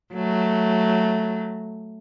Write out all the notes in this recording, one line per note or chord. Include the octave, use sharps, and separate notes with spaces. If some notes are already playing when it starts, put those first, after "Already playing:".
F#3 A3